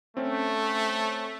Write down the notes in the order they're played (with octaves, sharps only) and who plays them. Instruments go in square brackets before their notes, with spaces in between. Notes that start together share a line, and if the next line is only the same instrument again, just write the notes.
[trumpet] A3 [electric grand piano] C4 C#4